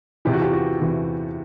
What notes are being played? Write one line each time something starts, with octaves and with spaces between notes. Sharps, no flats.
E2 C3 E3 G4
F#4
F4 G4
F#4
E2 C3 E3